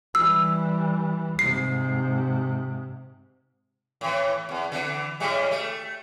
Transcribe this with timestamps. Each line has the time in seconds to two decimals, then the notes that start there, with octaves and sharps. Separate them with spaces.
0.15 E3 G3 E6
1.39 G#2 C3 C7
4.01 A2 E3
4.49 E2
4.72 D3 E3
5.20 A2 G3 G#3
5.51 A3